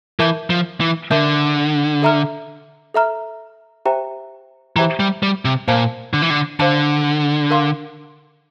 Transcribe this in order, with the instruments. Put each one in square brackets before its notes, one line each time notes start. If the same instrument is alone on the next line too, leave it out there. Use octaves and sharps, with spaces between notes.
[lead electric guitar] E3 [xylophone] A#4 E5 A5 D6 G6
[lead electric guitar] F3
E3
[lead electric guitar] D3 [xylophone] A#4 E5 A5 D6 G6
[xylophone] A4 E5 A#5 F6
A4 E5 A#5 F6
G4 C5 E5 G5 A#5
[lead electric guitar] E3 [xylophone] G4 C5 E5 G5 A#5
[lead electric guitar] G3
G3
C3
[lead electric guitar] A#2 [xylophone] C5 F5 A5
[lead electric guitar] D3
E3
D3
[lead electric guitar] D3 [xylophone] C5 F5 A5
[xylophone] A#4 F5 C6